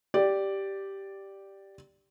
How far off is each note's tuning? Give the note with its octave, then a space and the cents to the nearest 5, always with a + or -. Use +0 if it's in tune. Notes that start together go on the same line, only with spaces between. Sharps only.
G4 -5 D5 +0